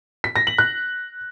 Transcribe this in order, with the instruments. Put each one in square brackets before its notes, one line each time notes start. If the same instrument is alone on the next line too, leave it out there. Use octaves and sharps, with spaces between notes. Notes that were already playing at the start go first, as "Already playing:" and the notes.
[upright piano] B6
A#6
F#7
F#6